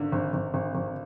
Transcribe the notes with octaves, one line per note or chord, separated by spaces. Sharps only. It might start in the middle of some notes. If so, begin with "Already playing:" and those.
Already playing: G#1 D3
G#1
G#1
G#1
G#1